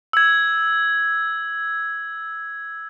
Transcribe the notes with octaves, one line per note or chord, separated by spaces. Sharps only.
E6 G#6